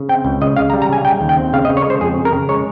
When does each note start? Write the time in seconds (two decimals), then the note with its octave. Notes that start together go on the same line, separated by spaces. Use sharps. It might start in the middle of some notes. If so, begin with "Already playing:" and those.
Already playing: C#3
0.09 C4 G5
0.25 C#2
0.41 C#3 D#5
0.57 C#3 F5
0.70 A#5
0.73 G3
0.82 A#5
0.89 C#3 G#5
1.05 C#3 G5
1.21 D#2
1.29 G5
1.38 C4
1.53 C#3 F5
1.65 D#5
1.69 C#3
1.77 C#5
1.86 G#3 C5
2.01 F2 G#4
2.18 C#3
2.25 A#4
2.34 C#3
2.49 G#3 C#5